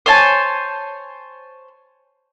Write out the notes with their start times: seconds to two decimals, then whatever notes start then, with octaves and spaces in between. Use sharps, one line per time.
0.06 C5 C#5 G#5 A5